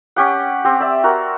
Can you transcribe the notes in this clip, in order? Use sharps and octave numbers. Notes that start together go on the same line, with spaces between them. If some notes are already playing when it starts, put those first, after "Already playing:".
C#4 G4 F#5
C4 G4
D5 E5
F#4 A#4